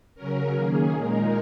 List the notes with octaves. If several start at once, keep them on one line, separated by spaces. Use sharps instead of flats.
C#3 F#3 C#4 A#4
D#3 A#3 C#4 G#4
A#2 G#3 D#4 A#4